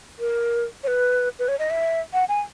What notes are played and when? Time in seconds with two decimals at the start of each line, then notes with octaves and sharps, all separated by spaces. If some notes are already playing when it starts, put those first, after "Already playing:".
0.19 A#4
0.83 C#5
0.87 B4
1.39 B4
1.48 C#5
1.59 D#5
1.70 E5
2.13 F#5
2.29 G#5